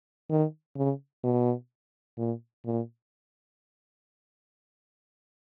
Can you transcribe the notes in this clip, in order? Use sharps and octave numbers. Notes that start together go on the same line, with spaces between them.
D#3
C#3
B2
A#2
A#2